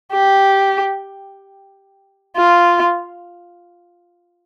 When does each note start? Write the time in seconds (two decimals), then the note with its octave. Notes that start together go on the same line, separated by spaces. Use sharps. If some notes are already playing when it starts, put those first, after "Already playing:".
0.12 G4
2.36 F4